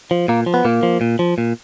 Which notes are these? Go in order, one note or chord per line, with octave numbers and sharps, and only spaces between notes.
F3
A#2 A#3
F3
B3
A#2 A#3
F3
A#2
F3
A#2